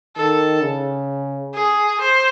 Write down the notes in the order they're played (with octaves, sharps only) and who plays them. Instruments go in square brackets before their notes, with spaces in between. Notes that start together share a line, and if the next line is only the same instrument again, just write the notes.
[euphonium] D#3 [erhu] A4
[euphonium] C#3
[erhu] G#4
C5